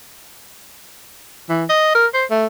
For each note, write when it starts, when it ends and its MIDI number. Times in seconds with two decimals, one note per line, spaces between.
1.50 1.65 52
1.70 1.93 75
1.95 2.07 70
2.14 2.25 72
2.31 2.46 57